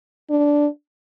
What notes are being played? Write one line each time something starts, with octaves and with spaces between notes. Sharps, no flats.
D4